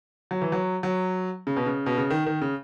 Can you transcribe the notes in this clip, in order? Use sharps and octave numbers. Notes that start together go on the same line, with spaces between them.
F#3
E3
F#3
F#3
C#3
B2
C#3
B2
C#3
D#3
D#3
C#3